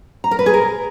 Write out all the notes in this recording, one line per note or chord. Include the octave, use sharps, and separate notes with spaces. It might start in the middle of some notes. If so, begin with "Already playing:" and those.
A#5
A#4
B4
G#4
A#4